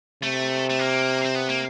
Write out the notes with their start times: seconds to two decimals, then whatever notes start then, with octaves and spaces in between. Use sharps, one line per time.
0.23 C3 A3
0.70 A3
0.79 A#3
1.25 C4
1.35 B3
1.50 A#3